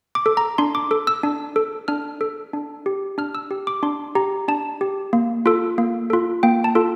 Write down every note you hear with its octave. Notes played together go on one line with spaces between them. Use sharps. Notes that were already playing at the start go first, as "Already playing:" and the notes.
D6
A4
A#5
D4 C6
D6
A4
E6
D4
A4
D4 F6
A4
D4
G4
D4 F6
E6
G4
D6
D4 C6
G4 A#5
D4 A5
G4
A#3
F4 A4
A#3
F4 A4
A#3 G5
A5
F4 A4